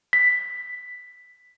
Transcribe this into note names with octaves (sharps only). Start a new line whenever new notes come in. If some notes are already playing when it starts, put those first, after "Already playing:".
B6